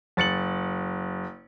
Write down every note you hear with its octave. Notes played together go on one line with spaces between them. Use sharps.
F#1 A6 C#7 F#7